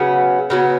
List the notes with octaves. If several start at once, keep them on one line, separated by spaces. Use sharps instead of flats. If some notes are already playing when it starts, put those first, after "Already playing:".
Already playing: C#3 F#3 B3
C#3 F#3 B3